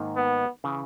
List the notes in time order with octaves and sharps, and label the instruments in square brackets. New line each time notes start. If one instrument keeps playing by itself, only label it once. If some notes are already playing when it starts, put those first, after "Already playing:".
Already playing: [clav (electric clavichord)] G#2 D#3 A#3 D#4
[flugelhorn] B3
[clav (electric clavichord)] C#3 E3